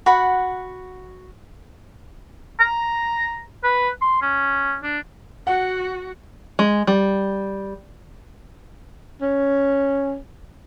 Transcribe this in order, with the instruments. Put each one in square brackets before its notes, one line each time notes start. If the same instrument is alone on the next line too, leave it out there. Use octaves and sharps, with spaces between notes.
[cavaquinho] F#4 F#5 B5
[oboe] A#5
B4
C6
C#4
D4
[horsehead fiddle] F#4 [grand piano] F#5
[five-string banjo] G#3
G3
[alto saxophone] C#4